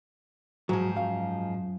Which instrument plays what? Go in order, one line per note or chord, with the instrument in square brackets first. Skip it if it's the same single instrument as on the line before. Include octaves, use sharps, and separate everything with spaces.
[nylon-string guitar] G#2 F3 [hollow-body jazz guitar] F#3
[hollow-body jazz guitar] F#2 F5